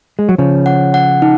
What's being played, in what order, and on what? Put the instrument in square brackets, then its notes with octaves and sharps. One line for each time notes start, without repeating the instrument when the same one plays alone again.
[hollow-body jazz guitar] G#3
F#3
[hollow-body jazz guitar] C#3 F3 [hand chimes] C#5
[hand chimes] F#5
F#5
D#4